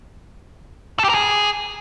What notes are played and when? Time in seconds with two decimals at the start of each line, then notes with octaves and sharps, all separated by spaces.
0.99 A4
1.04 G4
1.09 A#4
1.14 G#4